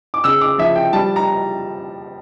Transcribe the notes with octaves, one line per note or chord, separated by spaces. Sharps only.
D6
C#3 E6
D6
F3 E5
G5
G3 A5
A#5